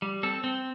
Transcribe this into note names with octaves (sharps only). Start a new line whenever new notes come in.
G3
C4 A4
C4